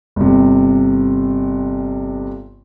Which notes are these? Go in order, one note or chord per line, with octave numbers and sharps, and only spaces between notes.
G1 C3